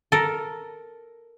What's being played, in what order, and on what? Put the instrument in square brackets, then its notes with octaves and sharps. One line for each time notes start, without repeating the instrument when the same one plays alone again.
[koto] A4 A#4